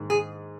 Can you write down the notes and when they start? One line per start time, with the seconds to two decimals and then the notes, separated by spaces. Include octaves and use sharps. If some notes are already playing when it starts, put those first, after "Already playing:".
Already playing: G#2 D#3 A#3
0.10 G#4